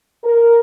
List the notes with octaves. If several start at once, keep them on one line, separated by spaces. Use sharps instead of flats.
A#4